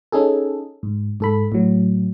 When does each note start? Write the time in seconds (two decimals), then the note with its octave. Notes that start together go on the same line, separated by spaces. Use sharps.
0.12 C#4 D#4 G#4 A4
0.83 G#2
1.20 G#2 A4 B5
1.52 A2 F#3